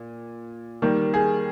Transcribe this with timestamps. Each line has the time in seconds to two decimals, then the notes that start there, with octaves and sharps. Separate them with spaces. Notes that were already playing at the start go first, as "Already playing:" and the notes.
Already playing: A#2
0.82 D#3 G3 A#3
1.14 G#4